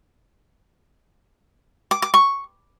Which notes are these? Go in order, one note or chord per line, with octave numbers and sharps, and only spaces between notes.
D6
D6
C#6